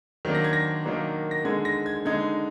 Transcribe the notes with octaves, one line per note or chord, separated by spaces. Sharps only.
D#3 F#3 A#3 D4
A#6
G#6
A#6
D#3 F#3 A#3 D4
A#6
D3 G#3 D#4 G#6
A#6
G#6
D3 G#3 D#4 G#6